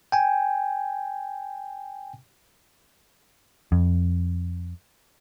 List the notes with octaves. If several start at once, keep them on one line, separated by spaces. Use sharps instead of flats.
G5 G#5
F2